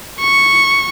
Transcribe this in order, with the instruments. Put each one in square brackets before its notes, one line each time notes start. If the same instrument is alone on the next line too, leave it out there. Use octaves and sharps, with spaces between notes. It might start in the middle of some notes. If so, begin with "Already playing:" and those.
[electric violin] C#6